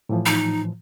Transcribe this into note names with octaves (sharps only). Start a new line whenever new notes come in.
A2 E3 F3
D#4